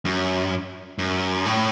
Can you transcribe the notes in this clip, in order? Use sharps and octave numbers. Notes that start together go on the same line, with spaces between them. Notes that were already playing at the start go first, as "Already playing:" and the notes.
F#2
F#2
A2